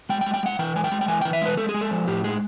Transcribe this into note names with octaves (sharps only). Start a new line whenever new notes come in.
G#3 G5
G5
G#3
G5
G#3 F#5
E3 G5
G#3 G#5
G5
G#3
G5
E3 G#5
E3 G5
E5
G#3 B4
G#3 A4
G#4
G#3
A4
F3
A2 G4
G#3 G#4